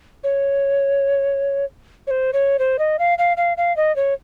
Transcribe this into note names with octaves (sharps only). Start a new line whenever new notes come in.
C#5
C#5
C5
C#5
C5
D#5
F5
F5
F5
F5
D#5
C#5